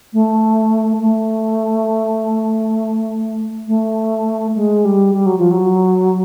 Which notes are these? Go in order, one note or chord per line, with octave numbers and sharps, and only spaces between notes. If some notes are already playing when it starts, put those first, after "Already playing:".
A3
A3
A3
G#3
G3
G3
F#3
F3
F#3